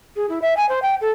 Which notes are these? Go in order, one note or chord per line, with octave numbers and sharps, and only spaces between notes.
G#4
E4
E5
G#5
C5
G5
A4